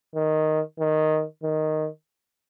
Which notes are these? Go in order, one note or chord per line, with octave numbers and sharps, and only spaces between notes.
D#3
D#3
D#3